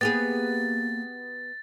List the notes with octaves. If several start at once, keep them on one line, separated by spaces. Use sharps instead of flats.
A#3 B3 G4 G#4 A6